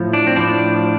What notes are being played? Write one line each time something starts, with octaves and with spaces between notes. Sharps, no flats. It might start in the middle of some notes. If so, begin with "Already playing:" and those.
Already playing: A2 F3
D4
C4
A2 F3 D4